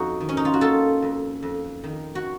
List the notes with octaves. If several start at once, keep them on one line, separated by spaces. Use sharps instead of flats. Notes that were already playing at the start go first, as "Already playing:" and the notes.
Already playing: F2 D#4 F#4
D#3
C#4
D#4
F4
F#4
A#3 F4 A4
F2
F2
D#3
F#4